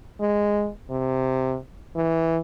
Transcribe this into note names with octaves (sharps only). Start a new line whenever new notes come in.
G#3
C3
E3